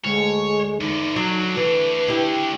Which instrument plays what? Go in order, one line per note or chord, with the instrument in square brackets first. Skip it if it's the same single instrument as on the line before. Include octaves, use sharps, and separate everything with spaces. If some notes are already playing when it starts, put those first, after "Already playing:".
[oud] D2 [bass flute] G#3 [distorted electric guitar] C#5
[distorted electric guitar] E2 D3 [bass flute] D#4
[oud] F#3 [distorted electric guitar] A3 D4
[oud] E3 [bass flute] B4
[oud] E4 G4